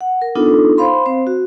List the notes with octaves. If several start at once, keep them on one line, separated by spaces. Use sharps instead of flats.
F#5
A#4
B3 D4 D#4 F4 A4
C5 F5 B5 C6
C4 C5
F#4